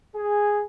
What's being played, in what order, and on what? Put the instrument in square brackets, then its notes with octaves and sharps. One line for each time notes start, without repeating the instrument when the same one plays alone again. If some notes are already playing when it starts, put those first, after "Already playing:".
[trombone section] G#4